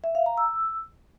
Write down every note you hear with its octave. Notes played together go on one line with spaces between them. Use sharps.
E5
F5
A#5
E6